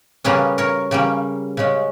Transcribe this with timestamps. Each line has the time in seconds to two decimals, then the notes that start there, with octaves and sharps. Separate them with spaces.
0.24 C#3 G3 A#3 C#4 G#4 B4
0.58 A#4 C#5
0.91 C#3 G3 A#3 C#4
1.57 C#3 G#3 C#4